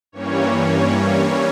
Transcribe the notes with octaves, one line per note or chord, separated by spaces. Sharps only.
G2 E3 G3 A#3 C#4 C#5